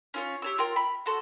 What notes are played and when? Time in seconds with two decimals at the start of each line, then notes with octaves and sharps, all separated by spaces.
0.14 C#4 F4 C#5
0.42 G4 C#5 E6
0.58 F4 A#4 G5
0.76 B5
1.06 F#4 A4 C5 F#5